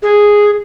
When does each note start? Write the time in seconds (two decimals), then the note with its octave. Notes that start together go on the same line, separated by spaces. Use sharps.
0.02 G#4